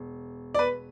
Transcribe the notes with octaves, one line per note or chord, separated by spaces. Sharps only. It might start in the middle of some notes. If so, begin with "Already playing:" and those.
Already playing: E1
D5
B4